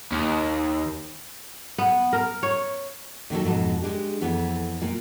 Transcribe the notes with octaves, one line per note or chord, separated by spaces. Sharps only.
D#2
B3
A#4
C#5
A#2 D#3 F#3 A4
F2 G#2 B2 A5
G#3 D4 G4
F2 E3 B3 A4
A#2 A#3